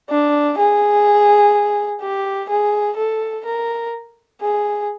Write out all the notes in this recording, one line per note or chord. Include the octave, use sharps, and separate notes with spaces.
D4
G#4
G4
G#4
A4
A#4
G#4